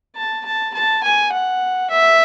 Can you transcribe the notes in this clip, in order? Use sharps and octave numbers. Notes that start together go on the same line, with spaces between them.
A5
A5
A5
G#5
F#5
E5